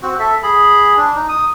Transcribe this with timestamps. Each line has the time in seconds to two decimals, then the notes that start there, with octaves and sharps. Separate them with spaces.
0.02 C4 F#4
0.19 A4 E5
0.43 G#4 B5
0.97 D4
1.15 D#4
1.29 D#6